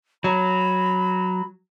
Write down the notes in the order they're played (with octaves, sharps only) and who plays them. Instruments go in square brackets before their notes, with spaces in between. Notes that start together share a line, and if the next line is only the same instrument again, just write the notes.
[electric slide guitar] F#3 [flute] B5